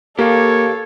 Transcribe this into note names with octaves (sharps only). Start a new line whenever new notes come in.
A#3 G4 A4 A#4 C#5 F5